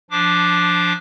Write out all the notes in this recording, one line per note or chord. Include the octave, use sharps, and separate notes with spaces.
F3 D4 D6